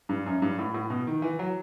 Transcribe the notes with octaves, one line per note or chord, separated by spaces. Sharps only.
G2
F#2
G2
A2
A2
B2
D#3
E3
F#3